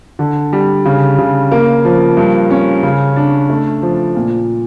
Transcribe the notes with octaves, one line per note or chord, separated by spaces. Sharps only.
D3
G3
C#3
C#3
A#3
F3
G2
C#4
C#3
D4
A3
F3
A#2